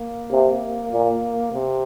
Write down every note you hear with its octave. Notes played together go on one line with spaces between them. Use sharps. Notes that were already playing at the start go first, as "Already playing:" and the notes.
Already playing: A#3
C3
A#2
C3